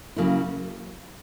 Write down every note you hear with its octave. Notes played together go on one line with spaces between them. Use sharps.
C#3 F#3 A#3 E4